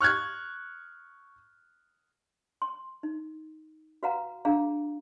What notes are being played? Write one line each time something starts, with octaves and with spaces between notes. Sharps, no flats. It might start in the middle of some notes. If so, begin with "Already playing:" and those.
C#6 F6 F#6 G#6
C6
D#4
F#4 B4 F5 F#5 A#5
D4 F4 G#4 F5 F#5 A#5